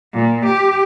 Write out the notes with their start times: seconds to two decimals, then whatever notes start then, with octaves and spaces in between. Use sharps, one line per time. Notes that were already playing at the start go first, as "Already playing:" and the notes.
0.13 A#2
0.46 G4